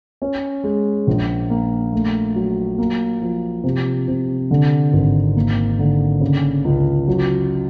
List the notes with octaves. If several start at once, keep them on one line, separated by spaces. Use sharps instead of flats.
C#4
G#3
A#1
A#3
A3
F#3
A#3
F3
C3
C3
D3
G#1
A#3
D3
C#3
C#2
F#3